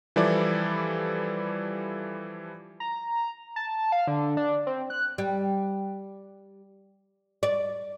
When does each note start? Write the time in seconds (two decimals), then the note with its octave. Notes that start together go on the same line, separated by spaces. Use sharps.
0.16 E3 F3 G3 E4 A4 D5
2.80 A#5
3.56 A5
3.92 F5
4.07 D3
4.37 D4
4.67 C4
4.90 F#6
5.18 G3
7.43 D5